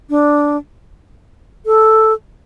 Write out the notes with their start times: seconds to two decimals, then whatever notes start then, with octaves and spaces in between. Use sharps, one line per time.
0.10 D4
1.66 A4